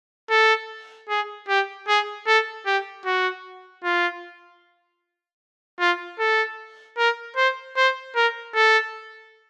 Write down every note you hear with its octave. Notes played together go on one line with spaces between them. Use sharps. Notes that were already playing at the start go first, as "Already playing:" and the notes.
A4
G#4
G4
G#4
A4
G4
F#4
F4
F4
A4
A#4
C5
C5
A#4
A4